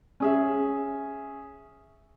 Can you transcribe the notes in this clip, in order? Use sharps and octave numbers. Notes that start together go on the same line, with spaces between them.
C#4 G#4 E5